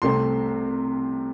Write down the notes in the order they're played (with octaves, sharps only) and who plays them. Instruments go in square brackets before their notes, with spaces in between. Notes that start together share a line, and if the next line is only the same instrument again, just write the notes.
[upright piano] C2 C3 A3 C4 C6